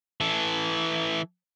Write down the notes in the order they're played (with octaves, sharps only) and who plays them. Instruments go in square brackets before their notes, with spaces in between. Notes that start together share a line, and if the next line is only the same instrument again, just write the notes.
[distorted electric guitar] E3 A4